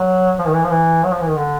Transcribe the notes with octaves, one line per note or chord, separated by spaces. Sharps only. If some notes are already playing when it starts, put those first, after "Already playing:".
Already playing: F#3
F3
D#3
E3
F3
E3
F#3
F3
E3
D#3
D3